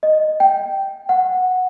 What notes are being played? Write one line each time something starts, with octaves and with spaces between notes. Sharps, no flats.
D#5
G5
F#5